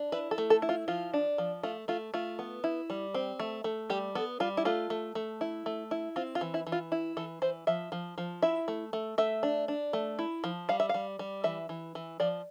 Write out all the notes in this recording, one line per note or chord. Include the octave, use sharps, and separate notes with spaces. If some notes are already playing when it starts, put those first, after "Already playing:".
Already playing: D4
E4 B4
A4
A3
A4
E4
F4
F3 F4
D4
F3
A3 F4
A3 F4
A3 F4
B3
E4
G3
C4
A3
A3
G3 G4
B3 A4
G3 F4
E4
A3 F4
A3
A3
E4
A3
E4
C4 F4
F4
E3
E4
E3
F4
E4
E3 A4
E3 C5
F3 E5
F3
F3
E4 E5
A3
A3
A3 E5
D4
D4
A3
E4
F3
G3 F5
E5
G3 F5
G3
E3 E5
E3
E3
F3 D5